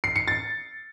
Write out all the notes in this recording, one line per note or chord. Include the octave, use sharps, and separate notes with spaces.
C7
C#7
A6